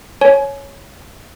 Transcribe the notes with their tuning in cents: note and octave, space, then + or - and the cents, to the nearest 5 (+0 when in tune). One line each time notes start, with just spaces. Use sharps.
C#5 +0 G#5 +30